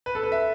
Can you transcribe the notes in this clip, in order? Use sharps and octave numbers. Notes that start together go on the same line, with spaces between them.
B4
A4
B4
E5